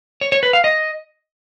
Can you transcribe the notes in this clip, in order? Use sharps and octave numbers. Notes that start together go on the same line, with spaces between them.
C#5
C#5
B4
F5
D#5